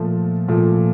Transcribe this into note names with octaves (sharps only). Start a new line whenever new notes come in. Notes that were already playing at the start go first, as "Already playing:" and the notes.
Already playing: A#2 F3 A3
A#2 F3 A3